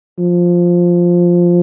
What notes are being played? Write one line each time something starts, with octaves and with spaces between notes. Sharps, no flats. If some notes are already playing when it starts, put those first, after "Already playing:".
F3